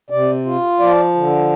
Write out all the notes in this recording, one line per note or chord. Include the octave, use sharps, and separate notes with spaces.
C3 D5
F4
F3 D5
D3